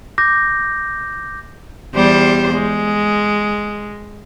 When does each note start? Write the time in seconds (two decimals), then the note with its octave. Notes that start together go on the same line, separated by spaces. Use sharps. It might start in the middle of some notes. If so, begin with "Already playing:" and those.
0.18 D6 G6 A#6
1.95 E2 G3 C5
2.54 G#3